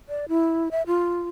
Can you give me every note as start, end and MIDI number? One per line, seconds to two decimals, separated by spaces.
0.09 0.25 74
0.29 0.69 64
0.71 0.82 76
0.87 1.29 65